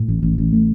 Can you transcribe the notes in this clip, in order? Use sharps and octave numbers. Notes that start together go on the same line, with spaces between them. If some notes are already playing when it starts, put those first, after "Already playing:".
Already playing: A2
A1
A1
A1
A3